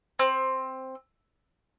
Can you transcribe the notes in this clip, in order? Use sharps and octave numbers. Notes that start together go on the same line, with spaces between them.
C4